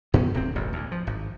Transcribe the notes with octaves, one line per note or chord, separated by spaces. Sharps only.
F#2 B3 C#4
D1 C4
E1 A1 D2 G2
D2 A2
F3
G#1